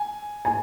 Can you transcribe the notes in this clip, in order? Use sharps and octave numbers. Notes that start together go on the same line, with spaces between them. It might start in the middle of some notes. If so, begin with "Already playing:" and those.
Already playing: G#5
G#5